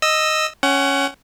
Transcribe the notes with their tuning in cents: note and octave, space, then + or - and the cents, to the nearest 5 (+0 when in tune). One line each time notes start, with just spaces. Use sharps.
D#5 +0 E6 +0
C#4 +0 F#5 +30